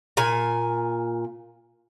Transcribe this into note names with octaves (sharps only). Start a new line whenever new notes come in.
A#2 G#5